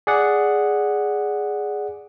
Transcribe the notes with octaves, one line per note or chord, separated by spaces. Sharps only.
G#4 D5 F#5